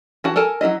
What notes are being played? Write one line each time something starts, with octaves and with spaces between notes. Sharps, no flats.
E3 F#4 A5
A4 A#4 G#5 A5
F#3 A#3 E4 D#5